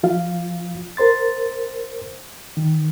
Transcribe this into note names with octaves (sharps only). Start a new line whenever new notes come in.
F3 F4 F5
A#4 C5 C6 A6
D#3